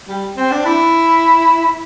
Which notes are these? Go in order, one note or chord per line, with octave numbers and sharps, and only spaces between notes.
G3
C4
D4
E4